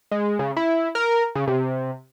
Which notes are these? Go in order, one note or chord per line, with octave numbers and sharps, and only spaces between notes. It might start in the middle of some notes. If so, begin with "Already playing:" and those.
G#3
C#3
E4
A#4
C#3
C3